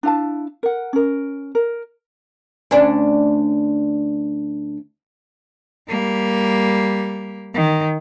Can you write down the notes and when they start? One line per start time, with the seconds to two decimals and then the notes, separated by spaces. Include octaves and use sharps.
0.03 D4 E4 F5 A5
0.63 A#4 F#5
0.93 C#4 A#4
1.55 A#4
2.71 D2 C#4 D4
5.88 G3 A#3
7.54 D#3